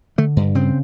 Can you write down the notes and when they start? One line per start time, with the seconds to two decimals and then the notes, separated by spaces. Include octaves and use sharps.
0.18 D3 A3
0.36 G2
0.55 C#3 C4